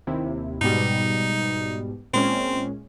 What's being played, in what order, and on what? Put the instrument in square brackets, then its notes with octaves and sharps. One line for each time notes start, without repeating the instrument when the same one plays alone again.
[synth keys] D#2 C3 E4
[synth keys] G#2 B2 G3 [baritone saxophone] D#4
[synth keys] A#2 G#3 C#4 [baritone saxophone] C4